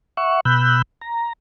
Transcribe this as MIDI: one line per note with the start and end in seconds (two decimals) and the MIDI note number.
0.17 0.40 76
0.17 0.40 78
0.17 0.40 85
0.45 0.82 47
0.45 0.82 83
0.45 0.82 88
0.45 0.82 90
0.45 0.82 91
1.01 1.33 82